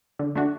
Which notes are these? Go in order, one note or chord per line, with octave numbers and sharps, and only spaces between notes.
D3
A3 D4 F#4